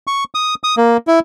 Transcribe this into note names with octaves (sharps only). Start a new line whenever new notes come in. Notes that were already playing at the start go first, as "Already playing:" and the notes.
C#6
D#6
D#6
A#3
E4